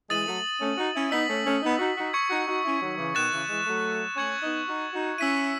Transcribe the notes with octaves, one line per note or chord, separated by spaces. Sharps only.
E3 G#3 D#6 A6 D#7 F#7
F#3 A3
A3 C#4
D#4 F#4
C#4 E4
B3 D#4 E6 B6 F#7
A3 C#4
A3 C#4
B3 D#4
D#4 F#4
D#4 F#4
C#6 G#6 C#7
D#4 F#4
D#4 F#4
C#4 E4
D#3 F#3
C#3 E3
B2 D#3 F#6 A6 E7
C#3 E3
E3 G#3
F#3 A3
A3 C#4 C#6 G#6 C#7 F#7
B3 D#4
D#4 F#4
D#4 F#4
C#4 E4 E6 B6 D#7